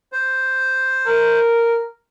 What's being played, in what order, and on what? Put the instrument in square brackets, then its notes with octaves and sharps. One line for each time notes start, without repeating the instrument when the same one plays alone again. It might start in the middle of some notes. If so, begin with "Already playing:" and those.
[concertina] C5
[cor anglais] A#4